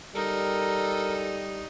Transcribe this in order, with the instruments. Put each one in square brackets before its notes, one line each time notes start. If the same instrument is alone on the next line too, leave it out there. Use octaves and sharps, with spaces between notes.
[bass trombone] G3 [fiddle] D#4 [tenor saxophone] A4 [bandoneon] A#4